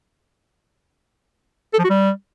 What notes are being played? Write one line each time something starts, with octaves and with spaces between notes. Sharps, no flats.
A4
F3
F#4
G3